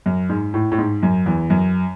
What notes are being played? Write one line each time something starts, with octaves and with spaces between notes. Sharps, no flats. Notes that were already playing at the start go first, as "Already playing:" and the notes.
F#2
G#2
A2
A2
G#2
F#2
E2
F#2